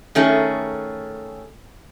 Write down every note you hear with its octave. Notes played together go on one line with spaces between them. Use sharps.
D#3 A3 C#4 G#4